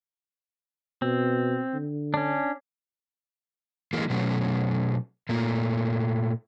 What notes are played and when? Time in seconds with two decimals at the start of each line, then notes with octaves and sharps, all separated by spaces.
1.02 B2 C4
1.74 D3
2.14 C#4 D4
3.93 E3 G#3 A#3
4.10 B2 F#3 A3 C#4
5.29 A#2 A3 A#3